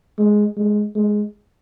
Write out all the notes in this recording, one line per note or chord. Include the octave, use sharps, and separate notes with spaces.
G#3
G#3
G#3